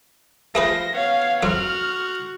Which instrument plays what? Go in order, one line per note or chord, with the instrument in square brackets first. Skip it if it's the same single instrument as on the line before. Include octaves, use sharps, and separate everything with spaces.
[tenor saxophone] F3 [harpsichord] A3 G#4 B4 [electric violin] A#6
[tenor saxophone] B3 [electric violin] C#5 F5
[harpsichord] F2 F#3 [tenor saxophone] F#4 [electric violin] F6